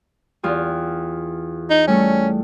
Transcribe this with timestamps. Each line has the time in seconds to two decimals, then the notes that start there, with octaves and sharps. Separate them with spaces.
0.43 E2 F4 G4
1.70 D#4
1.87 G3 A3 C#4 A4